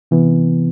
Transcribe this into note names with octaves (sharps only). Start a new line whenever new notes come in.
C3 E3 B3